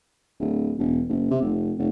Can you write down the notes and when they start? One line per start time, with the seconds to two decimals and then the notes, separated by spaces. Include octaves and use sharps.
0.39 D1
0.78 E1
1.09 F#1
1.31 C3
1.42 F1
1.78 F1